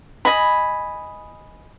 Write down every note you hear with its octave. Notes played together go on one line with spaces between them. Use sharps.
D#5 G#5 B5